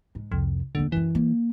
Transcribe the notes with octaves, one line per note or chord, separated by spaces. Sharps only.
G#2
C2 F2
D#2 D3 A3
F#2 E3 C4
A#3